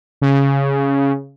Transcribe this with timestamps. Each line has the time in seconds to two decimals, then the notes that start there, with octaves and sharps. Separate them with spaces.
0.22 C#3